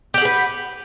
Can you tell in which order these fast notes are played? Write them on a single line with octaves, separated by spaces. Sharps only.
G4 F#5 G#4 B4